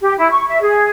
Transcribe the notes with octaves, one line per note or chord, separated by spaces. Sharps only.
G4
E4
C#6
E5
G#4